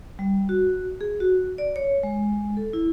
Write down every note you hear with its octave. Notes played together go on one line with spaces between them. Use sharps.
G3
F#4
G#4
F#4
D5
C#5
G#3
A4
E4